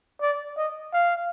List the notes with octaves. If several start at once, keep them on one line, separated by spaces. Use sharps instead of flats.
D5
D#5
F5